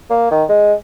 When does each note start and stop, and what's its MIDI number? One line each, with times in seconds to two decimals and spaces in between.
0.10 0.27 58
0.31 0.44 51
0.49 0.73 56